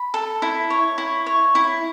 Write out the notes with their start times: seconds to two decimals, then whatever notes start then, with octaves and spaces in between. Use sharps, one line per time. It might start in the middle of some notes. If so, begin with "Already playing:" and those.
Already playing: B5
0.14 A4
0.42 E4
0.70 C#5
0.98 E4
1.26 C#5
1.55 E4